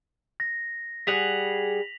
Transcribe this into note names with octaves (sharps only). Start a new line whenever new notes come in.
A#6
G3 G#4 F#5 B6 F7 F#7